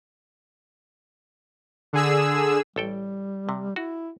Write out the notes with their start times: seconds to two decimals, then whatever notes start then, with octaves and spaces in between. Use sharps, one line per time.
1.93 D3 G#4 E6
2.76 A1 G3 A4 G5
3.49 C3
3.76 E4 F#4